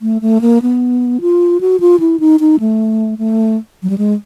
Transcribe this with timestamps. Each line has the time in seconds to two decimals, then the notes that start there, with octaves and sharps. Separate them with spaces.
0.02 A3
0.22 A3
0.41 A#3
0.62 B3
1.21 F4
1.61 F#4
1.80 F4
2.00 E4
2.20 D#4
2.40 D#4
2.60 A3
3.18 A3
3.83 F#3
3.90 G3
3.98 G#3